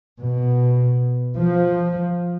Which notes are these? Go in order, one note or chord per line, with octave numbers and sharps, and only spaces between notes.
B2
F3